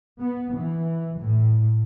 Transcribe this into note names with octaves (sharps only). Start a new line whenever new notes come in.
B3
E3
A2